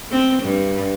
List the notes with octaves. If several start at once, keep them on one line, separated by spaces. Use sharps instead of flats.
C4
G2